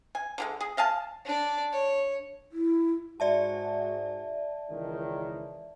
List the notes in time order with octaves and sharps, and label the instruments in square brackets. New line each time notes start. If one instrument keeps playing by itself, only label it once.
[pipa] G#5
D3 F#3 G#3
G#4
D#5 F5 G#5 A5
[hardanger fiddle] D4 D5
C#5
[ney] E4
[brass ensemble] G#2 F#4 [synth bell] D5 E5 A5
[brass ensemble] C#2 D#3 E3